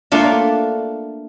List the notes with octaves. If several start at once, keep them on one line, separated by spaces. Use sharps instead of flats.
A3 A#3 D4 F4